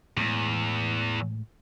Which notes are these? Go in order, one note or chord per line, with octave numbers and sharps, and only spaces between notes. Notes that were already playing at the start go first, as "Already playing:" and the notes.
E2 A2 G#3